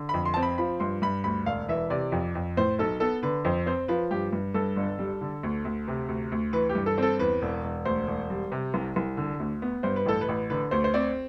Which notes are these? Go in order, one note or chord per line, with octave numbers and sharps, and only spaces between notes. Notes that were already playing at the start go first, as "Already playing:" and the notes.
Already playing: D3
F2 B5
C6
A5
C4
B5
F3 B5
G2 C6
G2 B5
D2 B5
E1 F5
E3 E5
C3 D5
F2
F2
A2 C5
B1 A4
B3 A4
D3 B4
F2 C5
C4 C5
F3 B4
G2 G4
G2
G2 A4
G1
G3
D3
D2
D2
C3
D2
D2
E3 B4
G4
G2
A4
C4 A4
E2 B4
E1
E1
D2 C5
E1
G3
C3
C2
C2
D3
D2
B3
G2 C5
B4
A1 A4
B4
A1
D3 B4
D2 C5
C5
C4 D5